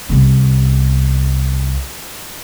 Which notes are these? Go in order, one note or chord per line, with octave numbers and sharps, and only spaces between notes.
C2 B3